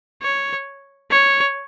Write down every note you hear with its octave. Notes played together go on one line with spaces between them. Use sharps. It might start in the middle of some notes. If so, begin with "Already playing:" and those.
C#5
C#5